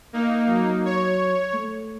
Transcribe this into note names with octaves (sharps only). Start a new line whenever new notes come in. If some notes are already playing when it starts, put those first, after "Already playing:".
A#3 D#4
F#3
C#5
A3